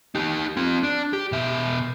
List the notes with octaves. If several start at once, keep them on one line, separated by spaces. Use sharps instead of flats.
D#4 G4
C4 F4
D4
G4
B2 E5